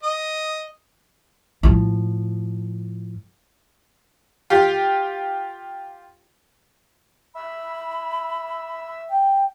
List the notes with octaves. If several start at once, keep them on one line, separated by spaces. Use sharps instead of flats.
D#5
A2 F3
F4 G4
E5 B5
G5